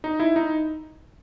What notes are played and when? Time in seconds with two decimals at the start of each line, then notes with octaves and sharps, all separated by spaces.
0.04 D#4
0.20 E4
0.36 D#4